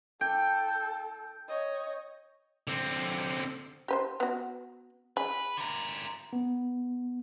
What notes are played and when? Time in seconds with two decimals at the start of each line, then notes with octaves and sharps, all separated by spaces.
0.21 A4 G5
1.48 C#5 D#5
2.68 D3 C4
3.88 G4 B4 C5
4.20 B3 F#4
5.17 G#4 B4
5.57 D3 A#4
6.33 B3